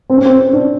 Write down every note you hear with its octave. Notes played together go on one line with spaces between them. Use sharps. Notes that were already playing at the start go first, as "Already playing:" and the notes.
C4
C#4
C4
D4